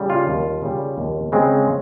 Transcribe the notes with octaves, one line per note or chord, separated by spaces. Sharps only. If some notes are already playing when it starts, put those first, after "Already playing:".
Already playing: C#3 G3
F4
D#2
C#3 G3
D#2
C#3 G#3 C4